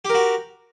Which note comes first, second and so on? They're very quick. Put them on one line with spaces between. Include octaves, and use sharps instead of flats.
G4 A#4 F#4